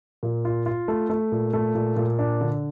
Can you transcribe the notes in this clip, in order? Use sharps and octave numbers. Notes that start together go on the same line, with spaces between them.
A#2
F4
F4
A3
A3
A#2
A3
A#2
A#2
D4
D3